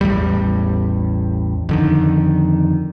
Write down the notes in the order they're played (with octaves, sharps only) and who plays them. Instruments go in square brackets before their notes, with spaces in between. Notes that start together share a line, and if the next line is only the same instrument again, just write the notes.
[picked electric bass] A1 E2 A2 G3
F2 D3 D#3